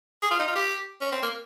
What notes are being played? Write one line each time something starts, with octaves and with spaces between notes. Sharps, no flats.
G#4
F4
D#4
F4
G4
C#4
C4
A#3